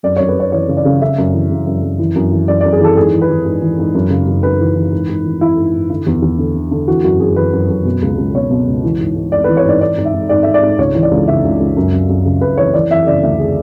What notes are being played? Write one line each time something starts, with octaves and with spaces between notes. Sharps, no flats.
F#2 D5
F#2 C#5
B4
F#2 C#5
E3 C#5
C#3
D5
C#3
C#3 E5
F#2
E3
C#3
F#2
F#2
E3
F#2
E3
F#2 D5
D5
F#2
G#4
E3 A4
G#2 G#4
E3
B4
E3
G#2
E3
G#2
F#2
C#3
F#2
F#2 B4
E3
E3
G#2
G#2
E3
E3 E4
G#2
G#2
D3 E4
E2
E2
D3
D3
D3
E3 F#4
F#2 F#4
F#2 G#4
E3 B4
F#2
F#2
B2
C#2
C#2
B2 C#5
B2
C#2
E3
G#2
G#2
G#2 D5
B4
E3
C#5
G#2 D5
G#2 D5
G#2
E5
G#2
G#2 D5
G#2 E5
D5
G#2
C#2 C#5
E3
D5
C#2
C#3 E5
C#2
C#2
F#2
F#2
F#2
C#3
F#2 B4
E3 C#5
E3 D5
E3 E5
C#3 D5
D2 E5
G#4